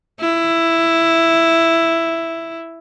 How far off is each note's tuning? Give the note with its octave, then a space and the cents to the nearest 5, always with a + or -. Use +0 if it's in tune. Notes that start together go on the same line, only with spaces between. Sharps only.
E4 +5